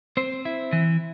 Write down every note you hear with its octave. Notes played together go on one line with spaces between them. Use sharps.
C4 C5
E4
E3